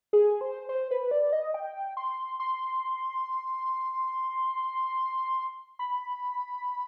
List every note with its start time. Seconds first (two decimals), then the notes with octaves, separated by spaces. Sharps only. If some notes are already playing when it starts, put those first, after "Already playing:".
0.13 G#4
0.41 C5
0.69 C5
0.91 B4
1.11 D5
1.33 D#5
1.54 G5
1.97 C6
2.40 C6
5.79 B5